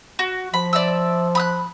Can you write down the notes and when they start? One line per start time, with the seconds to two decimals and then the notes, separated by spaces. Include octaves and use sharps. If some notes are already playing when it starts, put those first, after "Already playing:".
0.19 F#4
0.54 F3 B5
0.73 D5 E5 E6
1.35 B5 D#6 F#6